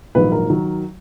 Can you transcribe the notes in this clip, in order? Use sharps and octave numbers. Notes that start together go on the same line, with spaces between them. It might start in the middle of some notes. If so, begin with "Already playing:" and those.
A#1 G#2 D#3 F#3 B4
A#4
D#3 F#3